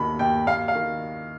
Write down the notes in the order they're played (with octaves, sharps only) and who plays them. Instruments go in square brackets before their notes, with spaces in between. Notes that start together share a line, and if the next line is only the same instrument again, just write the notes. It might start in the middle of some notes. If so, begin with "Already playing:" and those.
Already playing: [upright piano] D#2 D#3 B5
D#2 G5
D#2 F5
F5
D#3